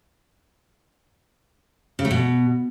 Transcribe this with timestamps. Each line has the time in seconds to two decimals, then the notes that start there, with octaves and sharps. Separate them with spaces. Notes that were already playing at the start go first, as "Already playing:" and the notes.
1.99 C#3
2.05 A3
2.11 B2